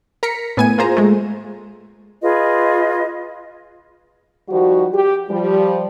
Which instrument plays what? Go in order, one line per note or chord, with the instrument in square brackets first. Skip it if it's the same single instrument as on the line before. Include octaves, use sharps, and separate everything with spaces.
[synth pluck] A#4 A#5 B6 C#7
A2 B3 G#5 G#6 D#7
A#3 F4 G#4 C5 A#5
G#3 A3
[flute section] F4 G#4 B4 D#5
[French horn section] D#3 F3 G3 F#4
G4
F3 G3